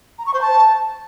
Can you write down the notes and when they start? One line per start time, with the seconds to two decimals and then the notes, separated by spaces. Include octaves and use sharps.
0.18 A#5
0.26 C#6
0.34 C5
0.41 A5